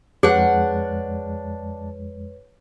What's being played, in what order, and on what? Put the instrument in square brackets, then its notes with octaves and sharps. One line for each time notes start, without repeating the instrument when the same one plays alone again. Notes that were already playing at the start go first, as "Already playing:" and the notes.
[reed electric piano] F2 G#3 [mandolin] D4 F#5 [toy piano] G#4 [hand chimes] B4 C#5